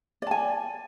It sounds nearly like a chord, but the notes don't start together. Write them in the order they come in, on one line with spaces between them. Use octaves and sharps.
D5 A5 G#5